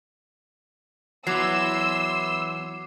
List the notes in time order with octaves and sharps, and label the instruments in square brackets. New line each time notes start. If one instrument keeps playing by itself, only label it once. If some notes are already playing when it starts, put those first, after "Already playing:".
[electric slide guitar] E3 B3 E4 [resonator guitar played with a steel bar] F#3 [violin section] C6 E6 [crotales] D6 C7